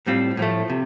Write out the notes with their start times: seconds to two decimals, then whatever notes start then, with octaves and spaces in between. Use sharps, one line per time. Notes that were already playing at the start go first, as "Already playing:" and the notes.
0.07 A2 G3 C4 F4
0.37 A2 F3 A3
0.70 C3